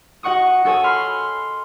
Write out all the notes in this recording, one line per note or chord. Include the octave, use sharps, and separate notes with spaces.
F#4 D#5 F#5 C#6 D#6
F#4 A4 C#5 G#5 D#6
B5 C6 F6